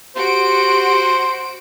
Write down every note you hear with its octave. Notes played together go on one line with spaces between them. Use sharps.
F#4 G4 C5 D7